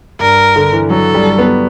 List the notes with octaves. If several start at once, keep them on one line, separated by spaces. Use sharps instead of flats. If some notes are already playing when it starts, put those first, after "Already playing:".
G2 A#4
D3
E3
F#3 A4
G3
B3